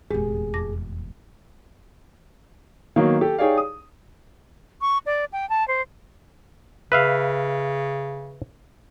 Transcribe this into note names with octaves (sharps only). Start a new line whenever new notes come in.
F1 E2 A#2 G#3 G4 G#4
F2 D6 A#6
D#3 F#3 A#3 B3 D#4
G4 A4
D#4 G4 G#4 C#5 D5 F5
D#6
C#6
D5
G5
A5
C5
C#3 B4 E5 F5